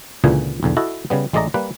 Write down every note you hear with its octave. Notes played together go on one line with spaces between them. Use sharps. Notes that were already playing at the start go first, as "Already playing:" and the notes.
C#2 A#2 D3 E3 G#4 G#5
B1 E2 D3
E4 F#4 A4 D#5
C#3 G3 B3
A1 G#3 A3 D5 D#5 A#5
G3 A#3 B4